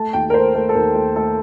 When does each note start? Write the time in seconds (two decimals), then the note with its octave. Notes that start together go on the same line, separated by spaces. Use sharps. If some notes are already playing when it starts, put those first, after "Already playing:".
Already playing: A3 A5
0.13 D#2 G5
0.30 A#4
0.34 A3 C5
0.54 A3 A#4
0.69 A4
0.75 D#2 A#4
0.95 A3
1.16 A3 A4